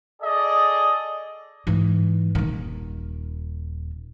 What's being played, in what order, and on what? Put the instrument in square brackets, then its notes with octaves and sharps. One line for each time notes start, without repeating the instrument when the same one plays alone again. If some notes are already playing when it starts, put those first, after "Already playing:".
[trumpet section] G#4 A4 D5 D#5
[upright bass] G#2 E3
D#1 D#3